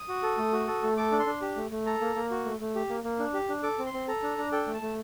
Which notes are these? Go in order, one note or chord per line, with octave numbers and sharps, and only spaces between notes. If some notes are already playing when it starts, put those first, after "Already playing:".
Already playing: D#6
F#4
A4
A3
F#4
A4
A3
A4 D6
D4
C6
D4
G4
A3
A3
A4 A#5
A#3
A#3
F#4
A3
A3
G4
A#3
A#3
D4
G4
D4
A4 D6
C4
C6
C4
A4 A#5
D4
D4
A4 G5
A3
A5
A3